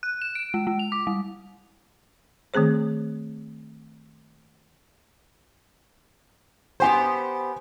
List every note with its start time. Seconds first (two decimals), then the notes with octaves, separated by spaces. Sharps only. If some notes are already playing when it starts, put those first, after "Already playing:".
0.03 F#6
0.22 E7
0.35 D7
0.54 G#3
0.67 G#3
0.79 F7
0.92 D6
1.07 G3
2.54 D#3 A3 C4 G#4 C5
6.80 B3 G4 C5 G#5 C6